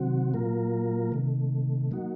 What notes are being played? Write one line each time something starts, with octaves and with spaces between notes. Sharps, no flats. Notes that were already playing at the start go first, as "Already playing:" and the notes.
Already playing: C3 D#3 F#3 C4 F#4
A#2 F#3 A#3 F4 A#4
C3 D#3 A3
F#3 A#3 D#4 F#4